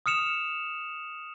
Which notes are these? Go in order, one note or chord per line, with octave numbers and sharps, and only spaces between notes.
D#6 F6 C#7 E7 F7